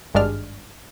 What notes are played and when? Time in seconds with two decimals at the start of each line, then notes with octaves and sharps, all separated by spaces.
0.14 G#1 G2 G#3 D4 F6